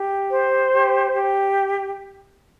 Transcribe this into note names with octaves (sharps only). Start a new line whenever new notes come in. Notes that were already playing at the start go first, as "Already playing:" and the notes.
Already playing: G4
C5
G4
G4